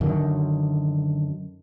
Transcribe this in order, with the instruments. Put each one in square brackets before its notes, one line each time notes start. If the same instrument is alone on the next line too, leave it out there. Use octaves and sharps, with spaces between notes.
[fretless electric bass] F#2 D3 D#3